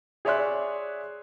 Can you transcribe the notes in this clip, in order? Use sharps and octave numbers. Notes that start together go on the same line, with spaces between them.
G#4 C#5 D5 E5 C6 F#6